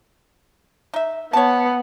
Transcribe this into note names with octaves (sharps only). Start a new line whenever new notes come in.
D#4 E5
B3 C#5 A5